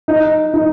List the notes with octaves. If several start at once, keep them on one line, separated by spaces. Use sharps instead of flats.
D#4
D#4